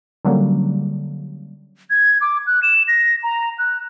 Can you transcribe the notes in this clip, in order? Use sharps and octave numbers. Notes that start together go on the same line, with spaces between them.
D3 F#3 G3 A#3 C#4
G#6
D6
F#6
E7
A#6
A#5
F#6